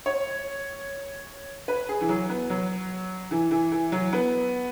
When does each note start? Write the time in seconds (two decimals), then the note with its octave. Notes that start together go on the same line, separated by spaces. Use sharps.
0.06 C#5
1.68 B4
1.89 G#4
2.01 E3
2.09 F#3
2.29 B3
2.50 F#3
3.31 E3
3.51 E3
3.72 E3
3.92 F#3
4.13 B3